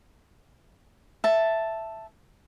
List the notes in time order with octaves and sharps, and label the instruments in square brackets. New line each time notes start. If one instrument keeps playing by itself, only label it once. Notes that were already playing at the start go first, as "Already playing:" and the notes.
[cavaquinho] E5 A5